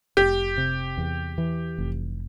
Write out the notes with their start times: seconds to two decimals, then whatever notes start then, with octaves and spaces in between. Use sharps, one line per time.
0.17 F1 G4
0.57 C3
0.98 E2
1.38 E3
1.78 F1